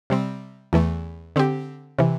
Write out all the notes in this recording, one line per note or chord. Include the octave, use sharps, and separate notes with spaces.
C3 G3 C4
E2 E3 A3
D3 C4 G4
C3 E3